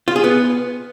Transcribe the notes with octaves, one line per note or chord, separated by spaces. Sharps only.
F4
G#4
B3